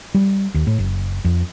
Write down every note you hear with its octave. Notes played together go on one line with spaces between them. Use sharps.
G3
D#2
A2
F#1
F2